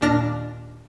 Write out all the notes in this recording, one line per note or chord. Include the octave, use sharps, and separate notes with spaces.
D#2 A#2 D4 F6 A#6